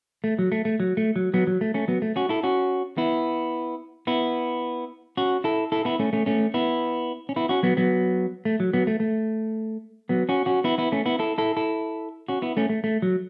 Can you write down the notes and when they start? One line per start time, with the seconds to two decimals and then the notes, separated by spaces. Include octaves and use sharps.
0.24 A3
0.39 F#3
0.52 A3
0.65 A3
0.80 F#3
0.97 A3
1.16 F#3
1.34 F#3 B3
1.47 F#3
1.61 A3
1.74 A3 C#4
1.88 F#3 B3
2.02 A3
2.16 C#4 F#4
2.29 E4 A4
2.43 C#4 F#4
2.97 B3 E4
4.07 B3 E4
5.17 C#4 F#4
5.44 E4 A4
5.72 E4 A4
5.85 B3 E4
5.99 A3 C#4
6.13 A3 C#4
6.26 A3 C#4
6.54 B3 E4
7.29 C#4
7.36 B3 E4
7.49 C#4 F#4
7.63 F#3 B3
7.77 F#3 B3
8.45 A3
8.60 F#3
8.73 F#3 B3
8.87 A3
9.00 A3
10.09 F#3 B3
10.29 C#4 F#4
10.46 C#4 F#4
10.64 B3 E4
10.78 B3 E4
10.92 A3 C#4
11.06 B3 E4
11.19 E4 A4
11.38 E4 A4
11.57 E4 A4
12.28 C#4 F#4
12.42 B3 E4
12.57 A3 C#4
12.69 A3
12.84 A3
13.02 F#3